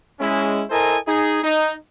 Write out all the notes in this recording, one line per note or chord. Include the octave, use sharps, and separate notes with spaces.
G#3 C#4 E4
E4 A4 A#4 C5 D#5 G#5
D#4 G#4
D#4